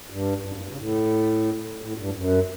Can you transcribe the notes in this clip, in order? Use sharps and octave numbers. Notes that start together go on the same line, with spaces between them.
G2
G2
F#2
G2
C#3
A2
A2
G2
F#2